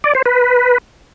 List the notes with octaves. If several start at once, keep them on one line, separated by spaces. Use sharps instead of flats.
D5
C5
B4